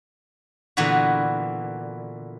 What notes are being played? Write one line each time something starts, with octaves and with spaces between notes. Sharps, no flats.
A#2 D3 E3 B3 E4 F#4